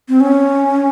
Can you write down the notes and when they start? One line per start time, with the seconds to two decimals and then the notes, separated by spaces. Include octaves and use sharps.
0.08 C4
0.20 C#4